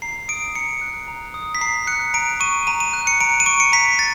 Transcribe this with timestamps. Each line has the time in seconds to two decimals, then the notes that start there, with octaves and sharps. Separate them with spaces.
0.02 A#5 C7
0.28 D#6 D7
0.55 A#5 C#7
0.81 F#6
1.08 A#5
1.34 D#6
1.55 B6
1.61 A#5 C7
1.87 F#6 C#7
2.14 A#5 D7
2.40 C#6 D#7
2.67 A#5 D#7
2.80 D#7
2.93 F#6
3.07 C#7
3.20 A#5 D7
3.40 D#7
3.46 C#6 D7
3.60 C#7
3.72 A#5 B6
3.99 A6